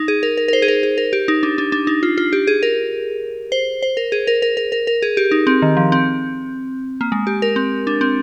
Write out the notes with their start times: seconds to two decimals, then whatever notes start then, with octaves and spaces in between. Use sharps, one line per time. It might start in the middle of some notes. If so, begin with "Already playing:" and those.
Already playing: D#4
0.08 G#4
0.23 A#4
0.37 A#4
0.48 A#4
0.53 C5
0.62 G#4
0.68 A#4
0.83 G#4
0.98 A#4
1.13 G4
1.28 D#4
1.43 D4
1.58 D4
1.72 D4
1.87 D#4
2.03 F4
2.18 F4
2.33 G4
2.47 G#4
2.63 A#4
3.52 C5
3.82 C5
3.97 A#4
4.12 G#4
4.27 A#4
4.42 A#4
4.57 A#4
4.72 A#4
4.87 A#4
5.02 G#4
5.17 G4
5.31 D#4
5.47 C4
5.62 D#3
5.77 F3
5.92 C4
7.01 A#3
7.12 G#3
7.27 G4
7.42 A#4
7.56 C4
7.87 D4
8.01 C4